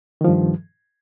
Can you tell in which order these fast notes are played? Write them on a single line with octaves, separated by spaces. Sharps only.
D#3 F3 G2